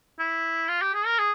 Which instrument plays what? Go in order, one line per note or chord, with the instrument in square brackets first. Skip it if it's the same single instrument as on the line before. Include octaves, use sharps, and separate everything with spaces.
[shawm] E4
F4
G4
G#4
A#4
G#4